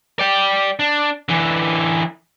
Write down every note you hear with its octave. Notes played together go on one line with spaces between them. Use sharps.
D5 G5
D4
D3 E3